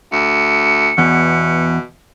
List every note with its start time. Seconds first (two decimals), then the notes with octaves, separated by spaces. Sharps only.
0.12 D2 C#7
0.98 E2 B2